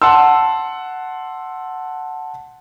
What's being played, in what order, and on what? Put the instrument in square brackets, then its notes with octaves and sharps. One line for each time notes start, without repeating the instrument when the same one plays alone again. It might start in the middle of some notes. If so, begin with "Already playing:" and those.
[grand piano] F#5 A5 C6 E6